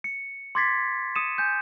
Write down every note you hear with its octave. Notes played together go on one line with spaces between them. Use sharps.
C#7
C6 D6 G#6 A6 B6 C7
D#6 C#7 D#7 E7
G#5 G6